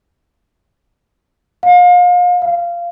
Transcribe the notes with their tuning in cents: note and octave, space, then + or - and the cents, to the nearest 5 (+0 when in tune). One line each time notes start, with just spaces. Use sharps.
F5 +35
F5 -10